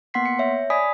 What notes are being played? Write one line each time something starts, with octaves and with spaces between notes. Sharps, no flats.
A#3 B3 F#5 C6 B6 C7
C#7
C#5 E5
D5 G#5 B5 D#6 B6